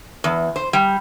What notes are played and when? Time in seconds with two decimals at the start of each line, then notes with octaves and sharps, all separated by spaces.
0.24 E2
0.56 C5
0.73 G3